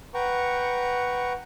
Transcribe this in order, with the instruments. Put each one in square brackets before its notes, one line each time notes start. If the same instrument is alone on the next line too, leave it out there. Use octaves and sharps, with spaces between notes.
[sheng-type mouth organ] B4 F#5 G5 A#5 C#6